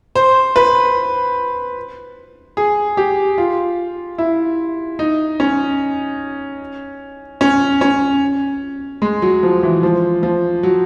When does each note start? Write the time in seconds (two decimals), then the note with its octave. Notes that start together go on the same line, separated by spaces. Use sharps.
0.15 C5
0.56 B4
2.57 G#4
2.97 G4
3.38 F4
4.18 E4
4.99 D#4
5.40 C#4
7.41 C#4
7.81 C#4
9.02 G#3
9.22 F#3
9.43 F3
9.63 E3
9.83 F3
10.23 F3
10.63 F#3